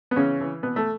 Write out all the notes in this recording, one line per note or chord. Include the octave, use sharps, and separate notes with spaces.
B3
C#3 E3 C#4
E3
B2 B3
A3